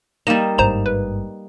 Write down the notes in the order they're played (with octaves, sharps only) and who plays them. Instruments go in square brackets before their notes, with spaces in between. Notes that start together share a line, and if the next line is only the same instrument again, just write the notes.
[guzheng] G3 D#4 [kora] A#3 D#5 [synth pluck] E7
[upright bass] G#1 G2 [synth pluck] C5 A#5 E7
[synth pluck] B4